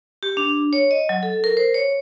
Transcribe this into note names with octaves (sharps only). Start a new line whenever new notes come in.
G4
D4
C#5
D#5
F#3
A4
A#4
C5
C#5